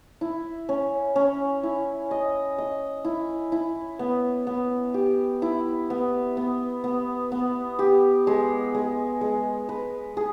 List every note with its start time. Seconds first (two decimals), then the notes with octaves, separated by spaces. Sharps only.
0.21 E4
0.69 C#4
1.16 C#4
1.63 E4
2.11 D#5
2.58 D#5
3.05 E4
3.52 E4
3.99 B3
4.47 B3
4.94 G4
5.42 E4
5.90 B3
6.37 B3
6.84 B3
7.32 B3
7.79 G4
8.27 G#3
8.74 G#3
9.21 G#3
9.69 B4
10.17 G#4